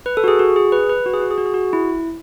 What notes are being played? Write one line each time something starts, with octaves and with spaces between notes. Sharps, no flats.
B4
A4
F#4
G#4
F#4
G#4
B4
B4
F#4
G#4
F#4
G#4
F#4
G#4
F#4
E4